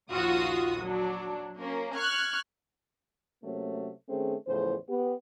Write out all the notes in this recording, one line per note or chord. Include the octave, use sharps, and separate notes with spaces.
A#1 D#2 F4 F#4 D#6
F#3 D4
A#3 C#4
C#6 F6 F#6 G#6
C3 F#3 A3 A#3 C#4
D#3 A3 C4 C#4 G#4
E2 A2 C#3 F3 C5
B3 G4